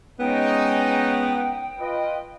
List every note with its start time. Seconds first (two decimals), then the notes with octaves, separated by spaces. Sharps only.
0.20 G#3 B3 C#4 D#4 G5
1.79 F4 B4 D#5